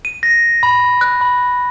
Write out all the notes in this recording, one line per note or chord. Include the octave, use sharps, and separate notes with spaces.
D#7
A#6
B5
F#6
B5